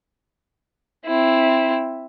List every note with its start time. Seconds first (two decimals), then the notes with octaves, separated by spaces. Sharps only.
1.05 C4 E4